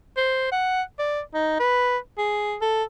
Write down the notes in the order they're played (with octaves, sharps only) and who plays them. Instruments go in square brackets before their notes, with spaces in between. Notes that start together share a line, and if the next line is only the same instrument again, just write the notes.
[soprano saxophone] C5
F#5
D5
D#4
B4
G#4
A4